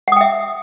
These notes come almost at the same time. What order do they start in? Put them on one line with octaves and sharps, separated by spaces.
F#5 D#6 G5 E5